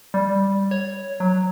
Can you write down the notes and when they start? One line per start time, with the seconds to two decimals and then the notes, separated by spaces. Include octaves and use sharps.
0.14 G3
0.71 C#5
1.20 F#3